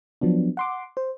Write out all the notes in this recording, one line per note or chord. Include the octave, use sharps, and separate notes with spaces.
F3 F#3 B3 D4
F#5 C6 D6
C5